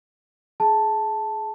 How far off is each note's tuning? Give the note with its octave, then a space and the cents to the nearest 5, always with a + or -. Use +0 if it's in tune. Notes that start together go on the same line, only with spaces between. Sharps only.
G#4 +20 A5 +0